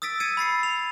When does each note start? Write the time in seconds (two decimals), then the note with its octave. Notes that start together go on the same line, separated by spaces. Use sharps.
0.02 D#6 E6 A6 B6 D7
0.20 E6 G#6 C#7 D#7
0.37 B5 A6 C7 C#7
0.63 F7